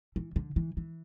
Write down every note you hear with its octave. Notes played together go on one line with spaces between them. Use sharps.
E3
D3
E3
E3